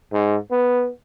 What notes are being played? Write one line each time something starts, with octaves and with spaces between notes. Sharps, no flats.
G#2
B3